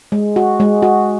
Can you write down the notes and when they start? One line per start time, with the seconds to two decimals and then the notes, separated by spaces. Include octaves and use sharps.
0.12 G#3
0.36 F#4
0.60 G#3
0.82 F#4